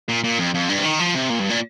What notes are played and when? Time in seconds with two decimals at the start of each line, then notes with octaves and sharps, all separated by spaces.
0.09 A#2
0.24 A#2
0.39 F2
0.54 F2
0.69 G2
0.78 C3
0.84 D#3
0.99 F3
1.14 C3
1.29 A#2
1.39 G2
1.50 A#2